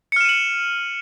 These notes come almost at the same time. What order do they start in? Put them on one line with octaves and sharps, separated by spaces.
C#7 F6 E7 D#7 F#7